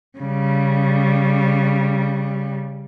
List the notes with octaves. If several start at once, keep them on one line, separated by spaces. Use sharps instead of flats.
C#3 G3